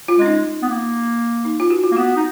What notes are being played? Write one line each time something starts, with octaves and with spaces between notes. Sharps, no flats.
F4
G#3 C#4
D#4
B3
A#3
D#4
F4
F#4
F4
A#3
B3 F#4
D#4